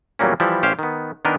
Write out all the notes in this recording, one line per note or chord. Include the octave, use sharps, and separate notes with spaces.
E2 A#2 F#3 G3 A#3 C#4
E3 F3 G3 E4
A1 C#4 G4 C5 F5
D#3 B3
D#3 B3 D4 A#4 D#5